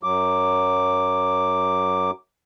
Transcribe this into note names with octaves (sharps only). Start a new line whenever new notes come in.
F#2 F#3 D6